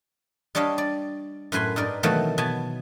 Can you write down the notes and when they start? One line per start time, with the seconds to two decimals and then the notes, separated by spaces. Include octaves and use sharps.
0.55 G3 D4 C#5 D#5 F5
0.78 D5
1.52 F#2 A2 B4 G#5 C6
1.76 G2 D#4 A#4 D5
2.03 B2 D#3 E3 F#3 A3 A#3
2.38 B2 B3 G#5 A5